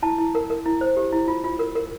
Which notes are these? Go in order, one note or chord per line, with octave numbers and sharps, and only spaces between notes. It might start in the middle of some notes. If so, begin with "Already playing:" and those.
E4 A5
E4
A#4
A#4
E4
C5
G4
E4
F4
F4
A#4
A#4